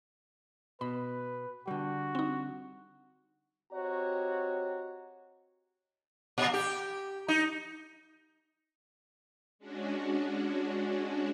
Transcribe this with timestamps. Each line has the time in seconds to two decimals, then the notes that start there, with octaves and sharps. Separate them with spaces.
0.81 B2 B4 B5
1.67 D3 G3 F#4
2.15 C4 D#4
3.72 C4 F#4 G4 C#5 D#5 A#5
6.38 A#2
6.54 G4
7.28 D#4
9.59 G#3 C#4 D4 F#4